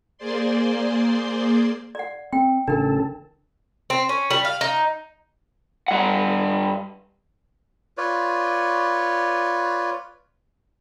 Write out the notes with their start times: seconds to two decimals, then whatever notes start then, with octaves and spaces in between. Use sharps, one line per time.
0.18 A#3 G#4 C5 D5 C6
1.95 D5 F#5
2.33 C4 G5
2.68 A1 C#3 D4 A4 A#4
3.90 C4
4.09 C#4
4.30 G3
4.45 F5
4.61 D#4
5.88 G2 F#5
7.97 F4 B4 C#5 D5